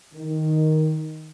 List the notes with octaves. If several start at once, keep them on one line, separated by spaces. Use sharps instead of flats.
D#3